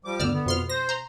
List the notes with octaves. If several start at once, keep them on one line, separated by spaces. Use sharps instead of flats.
F3 G3 D6
D2 G2 B3 D5 E6 F6
D3 B3
F2 B2 C6 F6
C5 A#6
A#5 C6